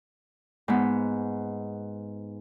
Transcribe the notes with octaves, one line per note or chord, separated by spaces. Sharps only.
G#2 B3